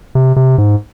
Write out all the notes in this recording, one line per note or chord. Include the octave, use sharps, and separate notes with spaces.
C3
C3
G#2